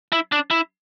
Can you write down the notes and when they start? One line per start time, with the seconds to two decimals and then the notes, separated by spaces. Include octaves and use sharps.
0.12 E4
0.32 D4
0.51 E4